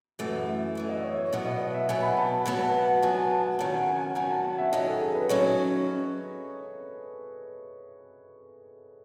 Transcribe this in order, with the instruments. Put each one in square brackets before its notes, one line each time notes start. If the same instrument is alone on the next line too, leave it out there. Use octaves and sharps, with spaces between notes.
[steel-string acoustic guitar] F#2 E3 A3
F#2 E3 A3
[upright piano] D#5
C#5
C#5
[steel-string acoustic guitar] B2 F#3 B3
[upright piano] D#5
D#5
E5
[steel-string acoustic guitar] B2 F#3 B3 [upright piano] G#5
[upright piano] B5
A5
A5
[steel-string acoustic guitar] B2 F#3 B3 [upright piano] A5
[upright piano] A5
F#5
[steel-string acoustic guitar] B2 F#3 B3 [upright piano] G#5
[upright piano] A5
A5
F#5
[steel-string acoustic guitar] D#3 F#3 C#4 [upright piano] F#5
[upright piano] G#5
G#5
G#5
[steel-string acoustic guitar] D#3 F#3 C#4 [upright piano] F#5
[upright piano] A5
F#5
E5
[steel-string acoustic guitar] D#3 F#3 C#4 [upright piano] D#5
[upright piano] A4
G#4
B4
[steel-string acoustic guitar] D#3 F#3 C#4 [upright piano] C#5